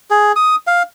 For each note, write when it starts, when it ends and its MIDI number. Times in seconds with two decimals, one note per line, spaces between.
0.11 0.32 68
0.36 0.56 87
0.67 0.83 77